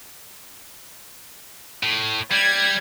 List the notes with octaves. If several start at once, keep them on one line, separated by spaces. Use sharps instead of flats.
A2
G3 G#6